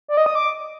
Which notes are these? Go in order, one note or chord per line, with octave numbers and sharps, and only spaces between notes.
D5
D#5
D#6
D6